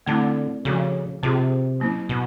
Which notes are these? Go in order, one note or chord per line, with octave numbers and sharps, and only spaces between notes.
D3 A3 C4 E4
C#3 F3 G#3 C#4 F#4 A4
C3 C4 F4 G#4
F#3 A#3 C#4 E4
B2